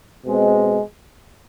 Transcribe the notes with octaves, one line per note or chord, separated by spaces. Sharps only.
B2 G#3 C4